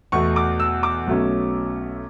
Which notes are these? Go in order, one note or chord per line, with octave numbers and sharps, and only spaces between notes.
E2 B2 A3 C#6
D6
E6
D6
B1 B2 A3 C#4